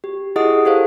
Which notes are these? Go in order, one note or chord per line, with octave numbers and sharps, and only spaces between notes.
G4
E4 G4 G#4 D#5 F#5 D#6
G4 A4 C5 F5